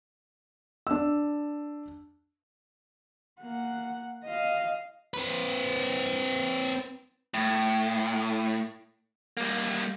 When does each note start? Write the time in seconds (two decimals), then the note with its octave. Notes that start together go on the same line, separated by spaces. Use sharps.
0.87 D4 E6
3.42 A#3 F#5
4.24 D#5 F5
5.14 C4 B4
7.34 A2
9.37 G3 A#3